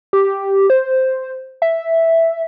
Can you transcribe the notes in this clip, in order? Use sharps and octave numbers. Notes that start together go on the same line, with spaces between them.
G4
C5
E5